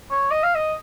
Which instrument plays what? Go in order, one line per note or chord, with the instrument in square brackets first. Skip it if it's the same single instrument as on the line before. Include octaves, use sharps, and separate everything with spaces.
[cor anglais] C#5
D#5
F5
D#5